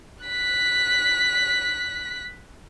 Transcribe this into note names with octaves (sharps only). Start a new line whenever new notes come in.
F#6 B6